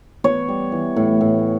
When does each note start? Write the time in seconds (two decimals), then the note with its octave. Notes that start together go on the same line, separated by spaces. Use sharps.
0.24 B3 C#5
0.48 G3
0.72 E3
0.96 A2
1.21 A2